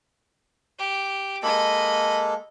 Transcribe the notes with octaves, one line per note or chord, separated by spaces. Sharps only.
G4
G#3 A#3 A4 D#5 B5